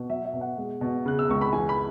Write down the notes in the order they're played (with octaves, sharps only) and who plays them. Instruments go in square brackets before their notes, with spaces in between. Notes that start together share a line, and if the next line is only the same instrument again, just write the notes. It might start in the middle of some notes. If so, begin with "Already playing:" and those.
Already playing: [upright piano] B2
F#3 E5
E5
B2
F#5
G#3
B2
C#3 F#6
E6
C#2 C#6
B5
E3 G#5
B5